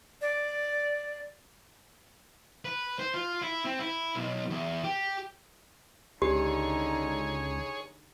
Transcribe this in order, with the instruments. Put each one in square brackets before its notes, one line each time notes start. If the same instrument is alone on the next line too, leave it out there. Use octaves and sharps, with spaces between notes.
[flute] D5
[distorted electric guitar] B4
C5
F4
E4
C4
E4
B1
E2
G4
[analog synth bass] C#2 [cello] D3 D#4 [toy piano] G4 [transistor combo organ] G#4 C#5